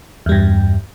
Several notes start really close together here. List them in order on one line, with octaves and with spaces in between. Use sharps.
E2 G3 G2